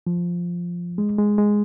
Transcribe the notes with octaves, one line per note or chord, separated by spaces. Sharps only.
F3
G#3
G#3
G#3